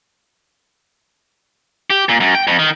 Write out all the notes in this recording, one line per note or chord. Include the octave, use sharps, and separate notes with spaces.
G4
A#2
F#2
G5
F2
D#3